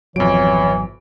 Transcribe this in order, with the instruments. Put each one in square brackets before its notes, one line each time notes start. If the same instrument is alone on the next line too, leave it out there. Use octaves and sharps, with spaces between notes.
[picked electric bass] G#1 B2 F#3 [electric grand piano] F2 D7 [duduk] E3 [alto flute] C#5